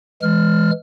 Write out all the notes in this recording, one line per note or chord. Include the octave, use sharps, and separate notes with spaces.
E3 G#3 F6